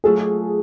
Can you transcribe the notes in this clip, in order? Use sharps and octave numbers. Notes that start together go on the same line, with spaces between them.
F#3 A3 F4 G#4 A4